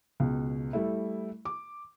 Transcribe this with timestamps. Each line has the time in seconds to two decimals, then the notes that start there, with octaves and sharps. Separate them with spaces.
0.20 C#2 B2
0.73 G3 A3 E4
1.45 D6